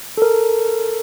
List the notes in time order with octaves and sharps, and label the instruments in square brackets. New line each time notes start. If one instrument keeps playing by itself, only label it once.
[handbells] A4 A#4